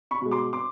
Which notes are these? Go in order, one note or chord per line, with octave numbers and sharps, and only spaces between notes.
B5 C#6
B2 G#3
C6 D6
C6 D6